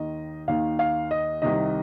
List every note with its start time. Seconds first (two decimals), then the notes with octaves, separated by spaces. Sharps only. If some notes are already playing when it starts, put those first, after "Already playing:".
Already playing: D#2 D#3 D#5
0.48 D#2 D#3 F5
0.79 F5
1.11 D#5
1.42 C2 C3 D#3 D#5